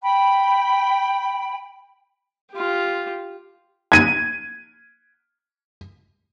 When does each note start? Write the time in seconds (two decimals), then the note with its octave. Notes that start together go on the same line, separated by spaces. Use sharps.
0.02 G5 B5
2.52 F4 G4
3.92 G#6 D#7